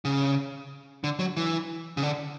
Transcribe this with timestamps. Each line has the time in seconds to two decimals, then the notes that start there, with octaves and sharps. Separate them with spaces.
0.05 C#3
1.04 D3
1.19 F#3
1.37 E3
1.97 C#3
2.03 D3